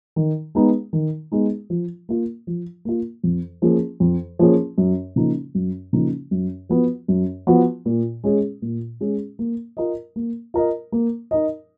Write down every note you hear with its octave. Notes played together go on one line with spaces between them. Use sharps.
D#3
G#3 B3 D#4
D#3
G#3 B3 D#4
F3
A#3 F4
F3
A#3 F4
F2
F3 A#3 C#4 G#4
F2
F3 A#3 C#4 G#4
F#2
C#3 F3 A#3 D#4
F#2
C#3 F3 A#3 D#4
F#2
F3 B3 F#4
F#2
F3 B3 F#4
A#2
G#3 C#4 G#4
A#2
G#3 C#4 G#4
A#3
F4 A#4 D#5
A#3
F4 A#4 D#5
A#3
D#4 A#4 D#5